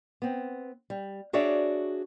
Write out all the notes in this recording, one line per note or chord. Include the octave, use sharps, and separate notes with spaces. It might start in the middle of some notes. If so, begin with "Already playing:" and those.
B3 C4
G3
D4 F#4 G#4 C#5 D5 E5